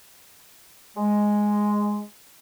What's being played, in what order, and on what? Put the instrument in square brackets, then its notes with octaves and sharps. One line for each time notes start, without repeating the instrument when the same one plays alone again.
[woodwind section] G#3